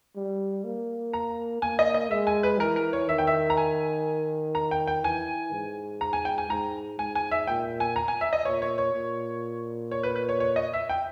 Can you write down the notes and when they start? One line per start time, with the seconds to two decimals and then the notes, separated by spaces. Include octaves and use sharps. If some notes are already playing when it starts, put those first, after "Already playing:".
0.16 G3
0.64 A#3
1.13 A#5
1.62 A#3 G#5
1.79 D#5
1.94 D#5
2.11 G#3 E5
2.27 G#5
2.43 B4
2.59 E3 A#4
2.76 A#4
2.93 C#5
3.09 D#3 E5
3.18 G5
3.27 E5
3.50 A#5
3.57 G#5
4.55 A#5
4.71 G5
4.87 G5
5.04 E3 G#5
5.52 G#2
6.01 A#5
6.13 G#5
6.25 G5
6.38 G#5
6.50 G#2 A#5
6.99 G#2 G#5
7.15 G#5
7.31 E5
7.47 A#2 G5
7.80 G#5
7.96 A#5
8.08 G#5
8.21 E5
8.33 D#5
8.45 A#2 C#5
8.62 C#5
8.78 C#5
8.94 A#2
9.91 C#5
10.03 B4
10.16 B4
10.29 C#5
10.40 C#5
10.56 D#5
10.73 E5
10.89 G5